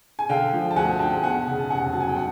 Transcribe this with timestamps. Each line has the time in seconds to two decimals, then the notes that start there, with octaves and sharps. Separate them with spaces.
0.19 G#5
0.29 D3 F5 G5
0.53 F3
0.71 A5
0.76 D2 F#5 G#5
0.99 D2 G5 A5
1.23 E2 F#5 G#5
1.47 C#3
1.59 A5
1.70 F1 F#5 G#5
1.93 F#3 A5
2.00 G#5
2.09 G5
2.16 F#5